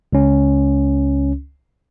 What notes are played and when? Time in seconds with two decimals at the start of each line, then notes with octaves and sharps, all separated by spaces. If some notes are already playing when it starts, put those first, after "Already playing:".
0.13 C#2 C#4